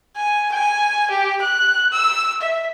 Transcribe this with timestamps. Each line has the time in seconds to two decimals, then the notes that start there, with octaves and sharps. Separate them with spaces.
0.16 G#5
0.52 G#5
1.10 G4
1.41 F#6
1.92 E6
2.41 E5